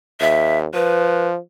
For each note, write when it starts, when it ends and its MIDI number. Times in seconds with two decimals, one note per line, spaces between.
0.21 0.66 39
0.21 0.58 76
0.74 1.38 53
0.74 1.27 71